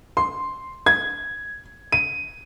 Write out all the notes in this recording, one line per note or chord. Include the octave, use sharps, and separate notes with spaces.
C6
G#6
D#7